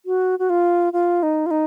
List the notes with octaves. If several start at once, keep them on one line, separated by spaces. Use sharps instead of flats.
F#4
F#4
F4
F4
D#4
F4
D#4